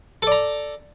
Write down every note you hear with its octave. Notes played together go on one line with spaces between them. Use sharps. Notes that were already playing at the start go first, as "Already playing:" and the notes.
A4 D5 A#5